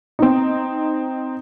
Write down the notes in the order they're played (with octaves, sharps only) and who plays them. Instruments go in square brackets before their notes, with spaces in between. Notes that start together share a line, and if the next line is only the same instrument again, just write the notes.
[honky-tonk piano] C4 D#4